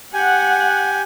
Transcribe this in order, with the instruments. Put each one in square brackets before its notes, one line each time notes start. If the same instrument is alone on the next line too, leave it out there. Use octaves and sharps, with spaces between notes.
[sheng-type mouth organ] G4 G#5 [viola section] F#5